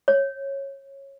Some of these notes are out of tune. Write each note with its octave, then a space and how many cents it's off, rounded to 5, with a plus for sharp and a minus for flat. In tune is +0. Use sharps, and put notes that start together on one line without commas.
C#5 -20